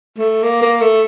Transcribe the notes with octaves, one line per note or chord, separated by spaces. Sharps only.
A3
A#3
A#3
A3